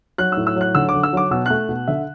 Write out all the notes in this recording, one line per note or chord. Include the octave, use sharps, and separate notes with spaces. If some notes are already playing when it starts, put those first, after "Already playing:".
F#3 F#6
A2 E6
E6
F#3 F#6
D3 E6
D6
D3
E6
F#3 D6
B2 E6
A3 F#6
B2
D3 E5